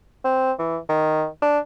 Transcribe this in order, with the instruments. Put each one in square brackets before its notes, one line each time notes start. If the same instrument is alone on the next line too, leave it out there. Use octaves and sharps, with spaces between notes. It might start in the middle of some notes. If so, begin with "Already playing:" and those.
[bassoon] C4
E3
D#3
D4